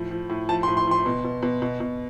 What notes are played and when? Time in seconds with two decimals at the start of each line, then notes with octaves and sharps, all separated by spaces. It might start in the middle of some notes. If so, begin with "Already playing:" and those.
Already playing: A2 F3
0.11 F3
0.30 A2
0.49 F3 A5
0.63 C6
0.68 A2
0.77 C6
0.87 F3 C6
1.06 B2
1.24 B2
1.43 B2
1.62 B2
1.80 B2